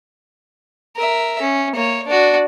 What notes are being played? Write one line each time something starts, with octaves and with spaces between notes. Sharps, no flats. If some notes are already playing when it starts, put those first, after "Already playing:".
A#4 E5
C#4
A#3 C#5
D4 F#4